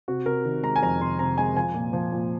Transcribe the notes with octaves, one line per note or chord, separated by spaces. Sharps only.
C3 F#4
C3 A#4
D#3
G#3 A#5
G#5
F2 A#5
C3 C6
C3 A#5
G#3 G#5
F3 G#5
A#2
F3
A#2